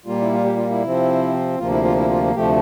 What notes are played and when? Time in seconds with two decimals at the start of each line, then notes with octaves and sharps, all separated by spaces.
0.06 A#2 G3 A#3 F4
0.21 E4
0.32 F4
0.44 G4
0.57 F4
0.70 E4
0.83 C3 F3 C4
1.58 D2 C3 F3 A#3 F4
1.71 E4
1.84 F4
1.97 E4
2.10 F4
2.35 D2 C3 F3 A3 G4